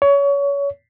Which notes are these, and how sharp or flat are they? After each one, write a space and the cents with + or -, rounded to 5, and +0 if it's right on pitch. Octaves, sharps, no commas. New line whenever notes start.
C#5 +25